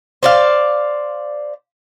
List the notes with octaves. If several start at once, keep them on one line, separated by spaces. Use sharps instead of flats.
C5 D5 F5